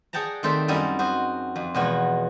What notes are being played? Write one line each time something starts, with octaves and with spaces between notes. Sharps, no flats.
G#4 D5 F#5 G5 A5 A#5
D#3 A3 C4 C5 D5 E5
F#2 G3 D#4 E4 G#5
F#4 C5 D#5
F2
E2 B2 F3 G#3 F#4